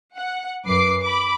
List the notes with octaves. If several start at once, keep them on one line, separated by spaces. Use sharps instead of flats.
F#5
F#2 B4 D6 C7
B5 D6